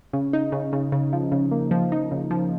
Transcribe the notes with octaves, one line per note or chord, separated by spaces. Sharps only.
C#3
D#4
C#3
C#3
C#3
F3
C#3
A#3
F3
D#4
C#3
F3